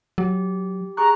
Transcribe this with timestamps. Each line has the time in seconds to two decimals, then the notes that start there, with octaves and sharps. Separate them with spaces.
0.18 F#3 G4
0.97 G#4 A#5 C#6 F#6